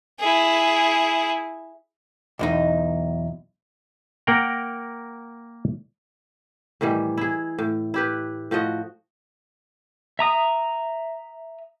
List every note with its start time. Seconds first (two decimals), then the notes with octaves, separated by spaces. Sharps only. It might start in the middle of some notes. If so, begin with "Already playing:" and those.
0.19 E4 G#4
2.39 B1 E2 D#4
4.27 A#3 A#4 F#5 G5 A#5
6.81 A2 D#3 E3 G3
7.17 E4 G#4
7.58 A2
7.94 E4 G4 B4
8.51 A2 F3 F#4 D#5
10.19 E5 A#5 D#6